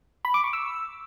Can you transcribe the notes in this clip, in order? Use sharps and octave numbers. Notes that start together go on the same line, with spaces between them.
B5
D6
C#6
E6